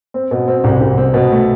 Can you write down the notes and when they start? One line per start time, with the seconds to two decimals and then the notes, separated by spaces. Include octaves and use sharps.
0.14 C4
0.31 B2
0.48 C4
0.64 C2
0.81 C2
0.98 C4
1.14 B2
1.31 A3